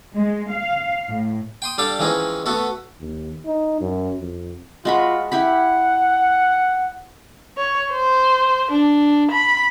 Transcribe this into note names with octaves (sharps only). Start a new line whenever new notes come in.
G#3
F5
A2
G5 C6 D#6
G3 D4 A4 F5 G5 A5
E3 F3 G#3 C4 C#4 D#4
A3 B3 F#4 A4
D#2
D#4
F#2
F2
G#3 F4 F#4 B5
E4 G4 F#5 B5
C#5
C5
D4
B5